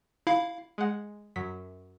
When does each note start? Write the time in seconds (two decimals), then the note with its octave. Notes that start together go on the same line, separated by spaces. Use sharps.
0.27 E4 F5
0.78 G#3 F#5
1.36 F#2 F#3 B6